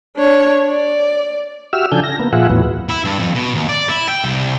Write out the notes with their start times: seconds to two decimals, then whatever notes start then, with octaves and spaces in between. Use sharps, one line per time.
0.17 D4 C#5
0.69 D5
1.73 F#4 G4 E5 E6 F6
1.92 C#3 F3 D4 A4 G#5 G6
2.04 A#6
2.20 A#3 B3
2.33 A#2 F3 F4 G#4 E5 F#5
2.50 D#2 A2 E3 F#3 B3
2.89 E4
3.05 G2
3.19 F2
3.35 B2
3.55 D#2
3.69 D5
3.89 E4
4.09 G5
4.24 C2